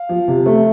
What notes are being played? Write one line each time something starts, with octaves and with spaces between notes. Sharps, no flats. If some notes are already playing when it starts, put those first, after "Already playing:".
Already playing: F5
F3
C3
A3